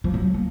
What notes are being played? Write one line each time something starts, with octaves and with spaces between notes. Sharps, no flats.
F3
F#3
A#3